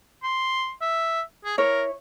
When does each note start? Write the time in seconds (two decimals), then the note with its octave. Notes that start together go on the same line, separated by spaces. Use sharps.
0.23 C6
0.81 E5
1.45 G#4
1.58 E4 A#4 C#5